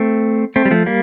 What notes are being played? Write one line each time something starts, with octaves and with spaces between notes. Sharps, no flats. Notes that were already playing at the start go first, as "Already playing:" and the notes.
Already playing: A3 C4
A3 C4
G3
F3 A3
G3 A#3